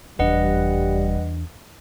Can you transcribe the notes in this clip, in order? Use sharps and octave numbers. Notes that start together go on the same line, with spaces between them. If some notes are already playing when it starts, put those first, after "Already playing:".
F1 E2 G3 D4 B4 D#5 F#5